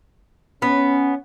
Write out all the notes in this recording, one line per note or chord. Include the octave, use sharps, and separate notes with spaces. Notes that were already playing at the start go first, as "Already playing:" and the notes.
B3 C#4